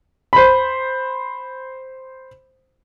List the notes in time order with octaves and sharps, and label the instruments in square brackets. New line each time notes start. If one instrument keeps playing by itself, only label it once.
[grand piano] C5 B5